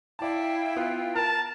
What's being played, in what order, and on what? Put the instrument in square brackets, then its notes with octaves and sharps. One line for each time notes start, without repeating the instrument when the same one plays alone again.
[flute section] E4 F5 G5 [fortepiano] D5 A5
[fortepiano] B3 F4 B4
[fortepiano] A#4 [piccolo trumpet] A5